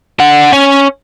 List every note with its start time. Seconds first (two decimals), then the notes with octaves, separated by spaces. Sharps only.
0.20 D3 F#5
0.53 C#4